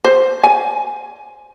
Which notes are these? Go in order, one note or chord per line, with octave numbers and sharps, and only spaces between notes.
C5
G#5